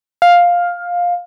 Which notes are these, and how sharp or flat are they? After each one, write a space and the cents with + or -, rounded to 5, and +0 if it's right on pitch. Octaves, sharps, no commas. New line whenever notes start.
F5 +10